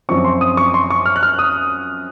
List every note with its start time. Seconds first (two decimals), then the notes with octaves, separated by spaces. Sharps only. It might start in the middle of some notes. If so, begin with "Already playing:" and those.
0.09 F#2 F3 C4 C#6
0.25 C6
0.41 D#6
0.57 C#6
0.74 C6
0.90 C#6
1.06 F6
1.16 F#6
1.23 F6
1.39 D#6